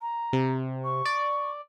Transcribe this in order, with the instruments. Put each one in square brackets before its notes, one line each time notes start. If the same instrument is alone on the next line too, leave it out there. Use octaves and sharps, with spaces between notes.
[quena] A#5
[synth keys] C3
[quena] C#6
[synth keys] D5